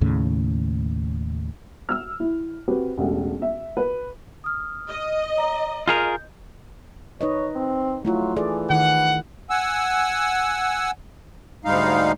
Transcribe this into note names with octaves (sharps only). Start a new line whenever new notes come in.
D#2 A2 C#3
E6 F6
E4
C4 F#4 G4 B4
E1 A1 A3
E5
B4
D#6 F6
D#5
C#5 A#5
F4 G#4 A#4 G6
D#4 B4 C#5 D#5
C4
F#3 A3 E4 F4
E3 G#4 A4 D5
D#3 E4 F#5
F#5 G#5 E6
D2 G#2 G3 G#3 D#4 F5